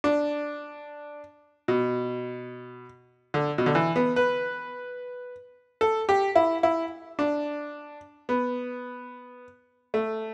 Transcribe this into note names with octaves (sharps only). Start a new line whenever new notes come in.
D4
B2
D3
B2
D3
E3
B3
B4
A4
G4
E4
E4
D4
B3
A3